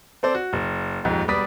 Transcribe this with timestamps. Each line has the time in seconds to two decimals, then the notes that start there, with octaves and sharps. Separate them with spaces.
0.23 C4 A4 C5 D5
0.35 F#4
0.53 F#1
1.04 D#1 F2 G#2
1.28 E1 G3 B3 D5 D#6 B6